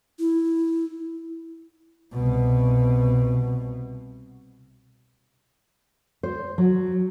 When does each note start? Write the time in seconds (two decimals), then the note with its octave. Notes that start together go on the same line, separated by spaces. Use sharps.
0.19 E4
2.13 C2 B2
6.23 C5
6.58 F#3